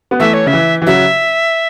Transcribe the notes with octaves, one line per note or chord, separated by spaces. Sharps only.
B3
E3 A3 E5
C#5
C#3 E5
E3
E3
C#3 F#3 E5